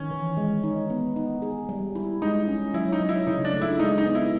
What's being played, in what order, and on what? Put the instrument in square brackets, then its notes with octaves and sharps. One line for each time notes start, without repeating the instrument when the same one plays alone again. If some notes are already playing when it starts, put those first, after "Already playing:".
Already playing: [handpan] D#3 [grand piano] C#4
[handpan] E3
G#3
D#4
B3
D#4
G#4
G3
E4
[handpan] G#3 [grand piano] D#4
[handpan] C#4
[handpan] F#3 [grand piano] E4
[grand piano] D#4
[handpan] F#3
[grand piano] E4
[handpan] C#3 [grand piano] D#4
[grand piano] D4
[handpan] A3
[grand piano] E4
[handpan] G#3 [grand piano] D#4
[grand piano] D#4
[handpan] B3
[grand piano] E4